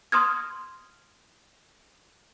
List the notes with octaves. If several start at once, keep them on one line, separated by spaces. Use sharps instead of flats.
C6 D#6 F6 G#6